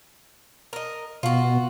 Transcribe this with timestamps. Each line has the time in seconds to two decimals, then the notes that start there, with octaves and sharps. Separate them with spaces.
0.73 A#4 D#5
1.23 B2 F4 F#4